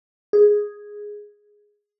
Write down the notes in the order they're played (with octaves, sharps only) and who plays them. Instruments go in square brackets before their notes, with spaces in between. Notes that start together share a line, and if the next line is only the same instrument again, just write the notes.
[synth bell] G#4